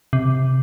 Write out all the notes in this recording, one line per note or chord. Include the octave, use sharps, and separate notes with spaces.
C3